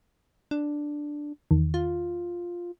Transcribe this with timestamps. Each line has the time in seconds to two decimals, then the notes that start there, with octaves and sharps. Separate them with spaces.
0.51 D4
1.51 E2 D#3
1.74 F4